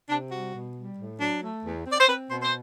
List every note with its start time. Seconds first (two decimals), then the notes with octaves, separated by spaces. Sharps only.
0.10 C3 D4
0.32 G3 F#4
0.54 B2
0.76 G3
0.98 A2
1.20 F#3 D4
1.42 A3
1.65 E2
1.86 C4
1.91 D5
2.00 C5
2.08 C4 B4
2.31 B2 C5
2.42 C5